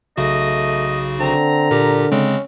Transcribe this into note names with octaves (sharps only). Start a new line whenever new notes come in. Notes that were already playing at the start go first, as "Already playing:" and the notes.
B1 C#3 A3 F#4 D#5
D3 C4 A#5
A#2 G4 A#4
C#3 G#3 C4 C#4